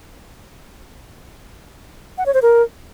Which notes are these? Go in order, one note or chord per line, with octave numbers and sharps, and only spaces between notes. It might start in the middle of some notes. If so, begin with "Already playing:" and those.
F#5
C#5
C5
A#4